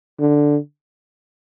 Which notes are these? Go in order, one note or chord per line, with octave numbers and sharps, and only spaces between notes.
D3